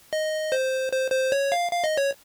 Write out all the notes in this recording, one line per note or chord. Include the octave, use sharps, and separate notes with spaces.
D#5
C5
C5
C5
C#5
F5
F5
D#5
C#5